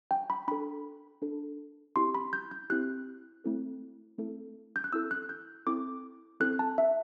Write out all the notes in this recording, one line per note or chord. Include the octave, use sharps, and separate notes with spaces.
G5
B5
D4 A4 B5
D4 A4
C4 E4 G4 C6
B5
G6
G6
C4 E4 G4 F#6
A3 C4 E4 A4
A3 C4 E4 A4
G6
F#6
C4 E4 A4 E6
F#6
G6
C4 E4 A4 D6
C4 E4 A4 F#6
A5
E5